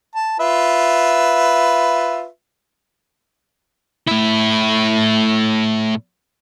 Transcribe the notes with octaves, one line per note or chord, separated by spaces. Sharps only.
A5
F4 B4 E5
A2 E4